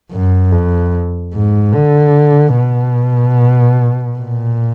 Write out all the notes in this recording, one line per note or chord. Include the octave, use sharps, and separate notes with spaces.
F#2
F2
G#2
D3
B2
A#2